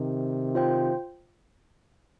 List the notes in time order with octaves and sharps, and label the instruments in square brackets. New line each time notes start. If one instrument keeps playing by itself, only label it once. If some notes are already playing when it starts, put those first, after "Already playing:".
Already playing: [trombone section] C3 D#3
[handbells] F4 C5 G5